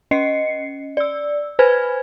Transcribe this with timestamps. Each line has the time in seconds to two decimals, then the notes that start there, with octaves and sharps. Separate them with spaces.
0.11 C#4 D#5 C7 C#7
0.97 D5 E6
1.59 B4 C5 G#5 B5 F6 G#6